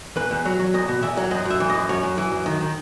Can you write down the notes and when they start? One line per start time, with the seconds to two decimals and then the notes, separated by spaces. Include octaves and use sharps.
0.16 E2 B4
0.31 E2
0.45 F#3
0.59 F#3
0.74 E2 D#5
0.88 B2
1.02 E2 E5
1.17 F#3
1.31 F#2 D#5
1.45 F#2
1.50 E5
1.60 E3
1.70 F#2 D#5
1.89 F#2 C#5
2.03 F#2
2.18 E3
2.31 F#2
2.46 D#3
2.61 D#3